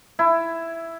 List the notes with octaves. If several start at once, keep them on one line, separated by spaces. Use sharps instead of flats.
E4